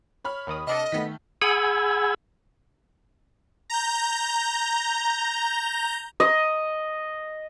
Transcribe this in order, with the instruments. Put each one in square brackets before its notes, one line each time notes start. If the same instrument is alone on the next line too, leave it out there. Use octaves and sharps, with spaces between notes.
[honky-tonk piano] C#5 B5 F6
[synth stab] D#2 D#3 D#6
[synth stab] C3 D4 A4 [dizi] D#5
[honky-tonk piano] D#3 A3 [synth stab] B3 B6
[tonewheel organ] G#4 F#5 G#5 B5 E6 G#6
[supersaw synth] A#5 G6
[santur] D#5